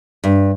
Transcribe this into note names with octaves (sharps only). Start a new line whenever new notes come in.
G2